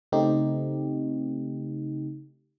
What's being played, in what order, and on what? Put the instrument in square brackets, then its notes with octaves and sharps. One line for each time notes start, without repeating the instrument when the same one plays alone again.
[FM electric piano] C#3 A3 C4 D#4 G4